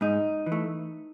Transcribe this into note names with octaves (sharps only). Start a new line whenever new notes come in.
G#2 D#4
E3
A3